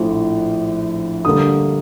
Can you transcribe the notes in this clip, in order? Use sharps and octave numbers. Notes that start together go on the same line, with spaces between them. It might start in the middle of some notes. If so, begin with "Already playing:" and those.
Already playing: A#1 A2 F3
D2 D3 G3 A#3 D#6